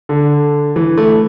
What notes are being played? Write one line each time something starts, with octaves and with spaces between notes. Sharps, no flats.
D3
E3
A3